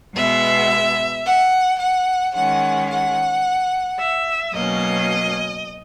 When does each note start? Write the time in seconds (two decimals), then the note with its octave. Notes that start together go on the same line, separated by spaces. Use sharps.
0.15 B2 G#3 B3 E5
1.25 F#5
1.79 F#5
2.34 D#3 G#3 C#4 F#5
2.89 F#5
3.98 E5
4.53 B2 F#3 A#3 C#4 D#5